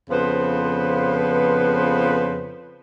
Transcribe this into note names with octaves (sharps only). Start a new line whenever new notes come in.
F2 C#3 F3 B3 B4 C5